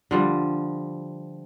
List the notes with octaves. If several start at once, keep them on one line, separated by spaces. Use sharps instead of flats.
D3 F3 G3